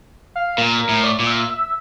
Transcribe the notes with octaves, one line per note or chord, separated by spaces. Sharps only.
F5
A#2 A#4
A#4
A2
D5
A#2
E5
E5